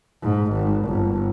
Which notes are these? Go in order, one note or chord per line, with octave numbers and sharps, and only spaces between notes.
G#2
G#1
G1